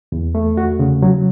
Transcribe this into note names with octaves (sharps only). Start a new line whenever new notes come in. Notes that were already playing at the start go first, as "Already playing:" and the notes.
E2
A3
F#4
C#3
F#3